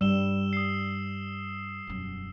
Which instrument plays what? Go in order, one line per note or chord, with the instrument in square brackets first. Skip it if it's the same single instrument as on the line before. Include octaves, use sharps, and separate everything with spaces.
[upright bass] G2 [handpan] G3 [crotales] E6 E7 G7
[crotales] D#6 C7
[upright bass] E1 F#2